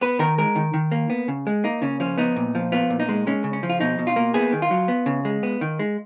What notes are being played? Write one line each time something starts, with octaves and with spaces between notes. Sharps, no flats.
B3 B4
D#3 A#4
G#3 A#4
D#3
D#3
A#3
B3
C#3
G#3
A#3 D#4
C#3 C#4
F3 C#4
B3 D#4
A#2
F3
B3 F4
A#2
D#4
G#3
G#3 C#4
C#3
C#4
F3
F4
B2 D#4
B2
F4
A#3
B3 G#4
D#3
F4
F#3
B3
C#3
G#3
B3
D#3
G#3